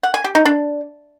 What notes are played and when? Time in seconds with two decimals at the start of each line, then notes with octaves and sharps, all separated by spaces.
0.03 F#5
0.14 G#5
0.24 G4
0.35 D#4
0.45 D4